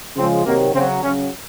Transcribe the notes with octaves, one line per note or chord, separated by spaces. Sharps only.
C#3 F3 G#3 C4
C3 D#3 F#3 A#3
C#3 F#3 C4
C#3 F#3 C#4